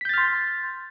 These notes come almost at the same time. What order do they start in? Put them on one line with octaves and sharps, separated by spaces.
B6 G6 A6 F6 C6